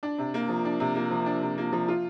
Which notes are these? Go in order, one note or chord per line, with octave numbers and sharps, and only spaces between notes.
D4
C3
A#3
F3
D4
C3
A#3
F3
D4
C3
A#3
F3
F4